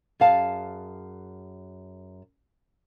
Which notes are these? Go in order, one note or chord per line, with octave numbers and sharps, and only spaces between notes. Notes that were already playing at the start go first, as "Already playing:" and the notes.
F#2 G#4 F5 A5